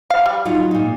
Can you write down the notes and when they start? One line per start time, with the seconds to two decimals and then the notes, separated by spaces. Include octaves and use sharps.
0.10 F5
0.26 G3
0.45 F#3 D#4 F4
0.71 A#2 D#4